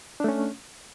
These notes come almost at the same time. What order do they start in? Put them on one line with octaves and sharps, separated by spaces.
D4 A3 C#4